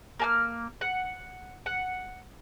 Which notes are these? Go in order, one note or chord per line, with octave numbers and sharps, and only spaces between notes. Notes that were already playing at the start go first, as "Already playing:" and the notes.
A#3 G#5 F6
F#5
F#5